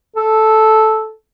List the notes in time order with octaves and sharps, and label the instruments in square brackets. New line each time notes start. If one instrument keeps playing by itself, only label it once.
[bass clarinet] A4